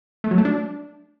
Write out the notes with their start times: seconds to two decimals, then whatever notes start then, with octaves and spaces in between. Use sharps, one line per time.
0.24 A3
0.31 F#3
0.38 A3
0.45 D4